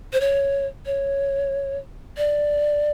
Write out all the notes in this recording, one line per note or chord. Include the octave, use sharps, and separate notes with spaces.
C5
C#5
C#5
D5